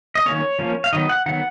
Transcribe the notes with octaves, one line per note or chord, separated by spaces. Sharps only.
D#5
D#3 F#3 A#3 C#4 C#5
F3 A#3 C#4
F5
D#3 F#3 B3 D#5
F#5
D#3 F#3 B3 F#5